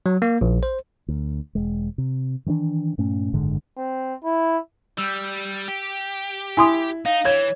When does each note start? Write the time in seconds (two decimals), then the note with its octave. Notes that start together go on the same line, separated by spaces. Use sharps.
0.06 F#3
0.22 A#3
0.41 A#1
0.63 C5
1.08 D2
1.55 E1 G#3
1.98 C3
2.46 D#3 E3 B3 D4
2.98 G2 A#2 A3 C#4
3.33 F#1 G#2 D3 G#3
3.77 C4
4.24 E4
4.98 G3 E6 G6
5.68 G4
6.57 E4 G#5 C6 D#6
7.06 D#4 F5 A#6
7.25 E3 C#5 G#6